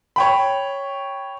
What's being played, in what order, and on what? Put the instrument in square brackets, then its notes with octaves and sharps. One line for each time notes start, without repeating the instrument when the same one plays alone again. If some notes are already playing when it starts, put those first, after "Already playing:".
[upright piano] C#5 G5 B5